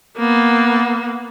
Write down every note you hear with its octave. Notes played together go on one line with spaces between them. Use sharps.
A#3 B3